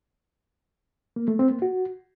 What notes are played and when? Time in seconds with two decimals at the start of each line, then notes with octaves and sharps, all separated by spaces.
1.16 A#3
1.28 A3
1.39 C4
1.51 A#3
1.62 F#4